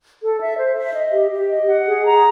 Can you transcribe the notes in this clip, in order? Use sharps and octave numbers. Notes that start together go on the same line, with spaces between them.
A4
E5
C5
E5
D#5
G4
G4
D#5
F#5
G#4
A#5